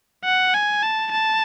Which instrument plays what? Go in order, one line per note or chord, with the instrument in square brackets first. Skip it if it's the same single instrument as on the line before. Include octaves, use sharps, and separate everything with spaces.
[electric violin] F#5
G#5
A5
A5